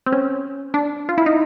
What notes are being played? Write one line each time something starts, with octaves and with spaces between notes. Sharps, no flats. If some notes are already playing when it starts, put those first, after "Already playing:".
C4
C#4
D4
F4
E4
D#4